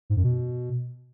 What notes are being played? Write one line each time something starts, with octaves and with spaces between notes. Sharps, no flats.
G#2
F#2
B2